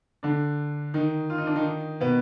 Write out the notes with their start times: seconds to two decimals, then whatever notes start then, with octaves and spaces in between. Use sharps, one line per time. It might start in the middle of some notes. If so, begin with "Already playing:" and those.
0.23 D3 D4
0.94 D#3 D#4
1.30 F4
1.38 D#4
1.47 D4
1.56 D#3 D#4
2.00 B2 B3